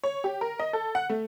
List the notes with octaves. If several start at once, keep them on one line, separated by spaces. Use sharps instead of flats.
C#5
G4
A#4
D#5
A4
F#5
A3